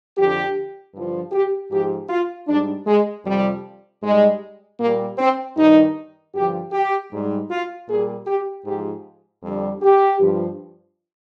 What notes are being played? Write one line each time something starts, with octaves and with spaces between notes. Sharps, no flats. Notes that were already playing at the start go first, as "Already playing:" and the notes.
F2 D3 F3 G4
G2 D3 F3
G4
G#2 F3 G4
F4
G#2 G3 D4
G#3
F2 C3 F3 G3
G#2 G3 G#3
A#2 G3 A#3
C4
G2 D#3 G3 D#4
G2 D3 F3 G4
G4
G#2 G3
F4
A#2 G3 G#4
G4
G#2 F3 G4
F2 D3 G3
G4
G2 F3